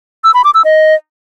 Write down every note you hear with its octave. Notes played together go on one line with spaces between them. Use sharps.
E6
B5
D6
E6
D#5